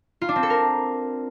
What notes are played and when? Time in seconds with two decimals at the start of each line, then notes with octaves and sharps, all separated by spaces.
0.21 F4
0.29 D4
0.36 C4
0.43 A4
0.50 A#4